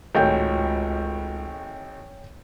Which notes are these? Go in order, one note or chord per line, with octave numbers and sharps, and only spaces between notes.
G#1 C#2 A2 F#3 C#5 G5 G6